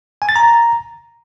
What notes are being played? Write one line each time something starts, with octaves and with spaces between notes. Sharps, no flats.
G#5
A6
A#5